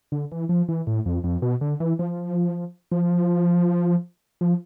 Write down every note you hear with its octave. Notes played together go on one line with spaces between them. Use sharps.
D3
E3
F3
E3
A2
F2
F2
B2
D3
E3
F3
F3
F3